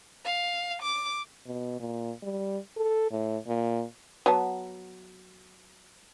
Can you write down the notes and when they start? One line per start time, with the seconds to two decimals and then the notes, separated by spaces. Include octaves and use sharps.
0.25 F5
0.82 D6
1.46 B2
1.80 A#2
2.23 G3
2.77 A4
3.11 A2
3.47 A#2
4.26 F#3 B3 A5